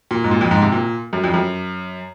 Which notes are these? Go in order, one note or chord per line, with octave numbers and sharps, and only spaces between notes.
A#2
G#2
A#2
F2
G#2
C3
A#2
F#2
F2
F#2